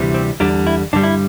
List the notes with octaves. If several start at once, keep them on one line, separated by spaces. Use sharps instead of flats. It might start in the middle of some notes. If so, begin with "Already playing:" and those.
Already playing: D2 C3 E3 G3
C4
E2 D3 G3 D4
E4
G2 D3 G3 D4
E4